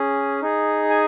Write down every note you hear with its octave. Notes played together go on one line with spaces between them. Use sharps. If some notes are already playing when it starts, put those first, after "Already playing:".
Already playing: C#4 G#4
D#4 G#4
G#5